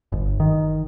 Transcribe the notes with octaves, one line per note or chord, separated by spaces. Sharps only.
G1
D#3